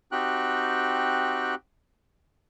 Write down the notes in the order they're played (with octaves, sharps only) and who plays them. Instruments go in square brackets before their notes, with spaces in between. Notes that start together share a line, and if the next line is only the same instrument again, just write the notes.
[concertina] C4 D#4 F#4 G4 G5 F#6